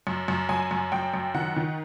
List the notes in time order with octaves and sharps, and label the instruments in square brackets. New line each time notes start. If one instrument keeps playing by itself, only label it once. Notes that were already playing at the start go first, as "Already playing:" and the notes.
[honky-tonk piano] F#2
F#2
F#2 G#5
F#2
F#2 G5
F#2
D#3 F#5
D#3